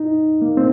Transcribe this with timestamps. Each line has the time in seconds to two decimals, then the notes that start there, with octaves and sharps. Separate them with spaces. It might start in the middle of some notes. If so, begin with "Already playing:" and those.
Already playing: D#4
0.42 A#3
0.57 C4